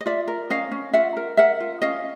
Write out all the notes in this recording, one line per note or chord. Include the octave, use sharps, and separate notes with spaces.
D#5
F4 D5 E5
A#4
C#4 D#5 F5
C#4
F4 E5 F#5
A#4
A#4 E5 F#5
F4
C#4 D#5 F5